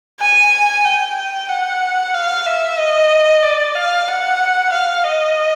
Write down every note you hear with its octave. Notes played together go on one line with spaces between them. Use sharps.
G#5
G5
F#5
F5
E5
D#5
D5
F5
F#5
F5
D#5